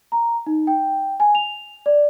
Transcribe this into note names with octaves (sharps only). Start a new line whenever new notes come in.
A#5
D#4
G5
G#5
F7
D5